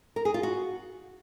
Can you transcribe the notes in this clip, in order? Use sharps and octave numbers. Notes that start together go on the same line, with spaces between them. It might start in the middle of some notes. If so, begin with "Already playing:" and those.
A#4
G#4
F4
F#4